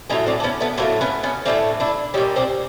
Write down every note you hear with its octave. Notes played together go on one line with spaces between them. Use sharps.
A2 F#3 A3 C#4 D#4
C4 D4
D4
B3 C#4
A3 B3
A2 F#3 A3 A#3 C4
B3 C#4
B3 C#4
A2 F#3 A3 C4 D4
D4 E4
A#2 G3 C#4 D#4
C4 D4